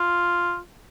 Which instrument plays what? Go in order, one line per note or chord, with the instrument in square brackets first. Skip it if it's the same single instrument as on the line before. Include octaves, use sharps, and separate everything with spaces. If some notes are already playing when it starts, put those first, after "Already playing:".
Already playing: [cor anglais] F4